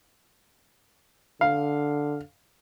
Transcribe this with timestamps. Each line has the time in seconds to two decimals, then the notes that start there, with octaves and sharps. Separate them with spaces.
1.41 D3 F5